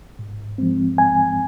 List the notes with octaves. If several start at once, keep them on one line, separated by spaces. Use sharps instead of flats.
G#2
F3 G#3 C4
G#5